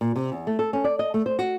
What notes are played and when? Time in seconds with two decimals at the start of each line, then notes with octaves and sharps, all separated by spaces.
0.01 A#2
0.16 C3
0.32 E2
0.47 A3
0.59 A4
0.73 C#4
0.84 D5
0.99 D#5
1.14 A3
1.26 C5
1.39 F#4